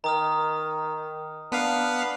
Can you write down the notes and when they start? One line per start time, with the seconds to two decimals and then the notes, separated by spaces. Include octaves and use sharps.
0.04 D#3 A#5 D#6 F6
1.52 B3 D4 B4 F5